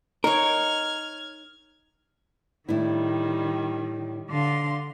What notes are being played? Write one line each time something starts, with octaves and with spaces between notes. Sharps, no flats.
D#4 A#4 C#5 F6 G#6
A2 D#3 G3 D4 E4
D3 F5 C6